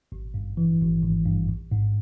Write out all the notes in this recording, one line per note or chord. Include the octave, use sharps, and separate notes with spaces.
G#1
G2
E3
G#1
G#1
G2
A1
G#2